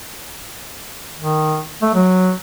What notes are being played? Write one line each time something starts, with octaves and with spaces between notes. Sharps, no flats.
D#3
A3
F#3